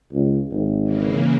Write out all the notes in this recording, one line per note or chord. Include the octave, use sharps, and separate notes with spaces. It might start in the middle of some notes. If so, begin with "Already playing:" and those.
C#2
G#1
C#3 E3 A#3